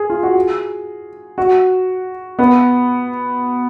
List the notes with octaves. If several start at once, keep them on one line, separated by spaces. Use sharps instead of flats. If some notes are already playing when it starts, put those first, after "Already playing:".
Already playing: G#4
F4
F#4
G#4
F#4
B3